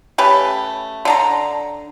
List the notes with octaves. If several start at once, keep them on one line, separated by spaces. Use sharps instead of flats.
A3 C#4 G4 B4
D3 D4 A#5